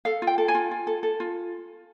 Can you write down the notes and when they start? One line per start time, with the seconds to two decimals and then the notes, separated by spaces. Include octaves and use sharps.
0.05 A4 F5
0.22 F4
0.27 G5
0.38 A4
0.48 G#5
0.55 F4
0.71 F4
0.87 A4
1.03 A4
1.20 F4